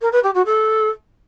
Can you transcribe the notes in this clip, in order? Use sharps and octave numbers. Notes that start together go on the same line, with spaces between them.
A#4
B4
G4
F#4
A4